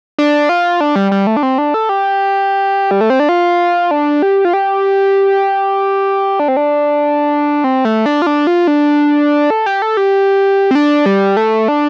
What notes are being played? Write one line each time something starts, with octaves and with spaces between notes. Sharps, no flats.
D4
F4
D4
G3
G3
A3
D4
C4
D4
A4
G4
G3
A3
C4
D4
F4
D4
G4
F4
G4
D4
C4
D4
C4
A3
D4
F4
D4
F4
D4
A4
G4
A4
G4
C4
D4
G3
A3
D4